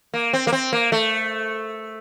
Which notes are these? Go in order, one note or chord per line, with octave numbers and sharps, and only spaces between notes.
A#3
C4
A#3
C4
A#3
A3